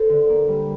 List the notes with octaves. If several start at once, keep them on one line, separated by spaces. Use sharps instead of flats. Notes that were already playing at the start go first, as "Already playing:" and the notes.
Already playing: A4 C5
D3
A#3
G3